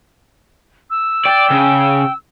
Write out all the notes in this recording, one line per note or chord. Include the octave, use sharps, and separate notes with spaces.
E6
D5 G5
C#3